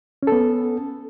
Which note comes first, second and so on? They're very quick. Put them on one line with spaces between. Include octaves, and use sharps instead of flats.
C#4 A4 B3